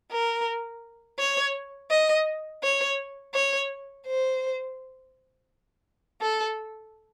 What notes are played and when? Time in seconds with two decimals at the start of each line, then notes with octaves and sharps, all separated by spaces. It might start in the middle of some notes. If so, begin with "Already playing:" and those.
0.12 A#4
1.19 C#5
1.91 D#5
2.63 C#5
3.34 C#5
4.07 C5
6.21 A4